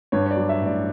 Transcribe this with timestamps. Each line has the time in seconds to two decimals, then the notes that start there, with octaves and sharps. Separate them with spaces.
0.12 G2 C#5
0.26 C#5
0.31 D5
0.36 F#3
0.49 E5
0.61 A1 D5